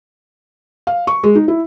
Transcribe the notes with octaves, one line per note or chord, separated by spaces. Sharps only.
F5
C#6
G#3
D#4
E4